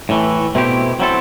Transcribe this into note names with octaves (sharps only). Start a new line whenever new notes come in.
A2 E3 A3
B2 A3 C4 E4 G4
F#3 C4 E4 A4